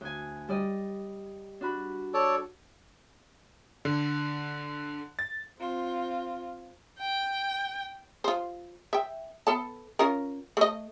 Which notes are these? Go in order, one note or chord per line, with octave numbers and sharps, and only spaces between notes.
D2 G#5
G3 D5 D#5
D4 F#4 B5
A4 C#5 D5
D3
A6
C4 F4
G5
F4 C5
E5 G5
B3 A4 A5
C#4 F4 A#4
A3 D#5